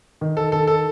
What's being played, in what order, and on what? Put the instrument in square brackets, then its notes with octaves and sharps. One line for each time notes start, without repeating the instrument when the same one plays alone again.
[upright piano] D#3
[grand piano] A4
[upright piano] D#3 [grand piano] A4
[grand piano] A4